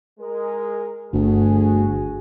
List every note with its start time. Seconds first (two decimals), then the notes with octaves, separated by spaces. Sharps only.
0.20 G#3 A#4
1.13 G1 D2 F#4 G#4